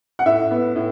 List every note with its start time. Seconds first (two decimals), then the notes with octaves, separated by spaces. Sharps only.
0.19 F#5
0.26 A2 E5
0.51 B3
0.76 A2